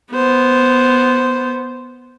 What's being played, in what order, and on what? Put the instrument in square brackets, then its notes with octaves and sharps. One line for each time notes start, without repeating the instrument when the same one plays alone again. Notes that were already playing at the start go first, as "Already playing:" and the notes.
[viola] B3 C5